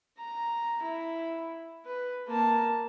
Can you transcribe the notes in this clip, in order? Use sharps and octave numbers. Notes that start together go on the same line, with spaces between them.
A#5
E4
B4
A#3 A5